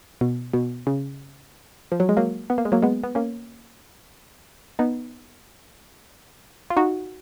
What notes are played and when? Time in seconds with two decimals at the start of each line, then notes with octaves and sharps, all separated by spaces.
0.21 B2
0.53 B2
0.87 C#3
1.92 F3
2.00 F#3
2.09 G#3
2.17 F#3 A#3
2.50 B3
2.58 A#3
2.65 G#3
2.72 F#3 A#3
2.82 G#3 B3
3.03 B3
3.15 A#3 C#4
4.79 B3 D#4
6.70 F4
6.77 D#4 F#4